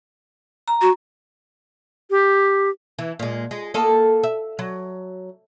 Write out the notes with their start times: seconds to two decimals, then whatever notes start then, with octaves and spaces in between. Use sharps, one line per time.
0.68 A#5
0.81 F#4
2.10 G4
2.99 E3
3.19 A#2 G#3
3.51 G#3
3.74 A#3 A4 D#5
4.24 E5
4.59 F#3